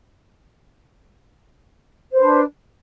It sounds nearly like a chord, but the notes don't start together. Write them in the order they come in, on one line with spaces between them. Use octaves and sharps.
C5 B4 D4